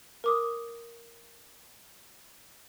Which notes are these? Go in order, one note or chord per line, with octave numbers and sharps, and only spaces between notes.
A#4 D6 D#6